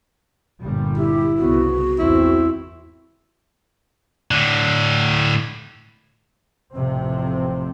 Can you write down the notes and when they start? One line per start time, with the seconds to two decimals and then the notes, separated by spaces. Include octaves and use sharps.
0.62 G1 A#2 G3
0.97 E4 G4
1.38 C2 C#3 B3 F#4
1.98 G#1 E2 C4 E4
4.31 A2 D3
6.74 A1 F2 C3 C4